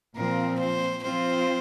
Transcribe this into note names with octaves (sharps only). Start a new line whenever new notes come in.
A#2 F3 C4 A#4
C5
F3 C4 F4 C5